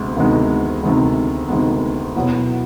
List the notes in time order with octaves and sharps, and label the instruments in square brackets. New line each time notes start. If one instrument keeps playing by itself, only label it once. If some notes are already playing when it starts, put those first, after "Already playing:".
Already playing: [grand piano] D2 C3 G#3 B3
D2 C3 D#3 G#3 B3
D2 C3 D#3 G#3 B3
D2 C3 D#3 G#3 B3
B2 F#3 B3 E4